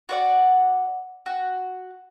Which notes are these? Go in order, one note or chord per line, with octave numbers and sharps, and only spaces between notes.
F#4 D5 F#5
F#4